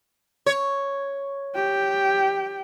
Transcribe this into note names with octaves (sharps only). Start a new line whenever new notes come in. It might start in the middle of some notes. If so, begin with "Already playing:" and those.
C#5
G4 G5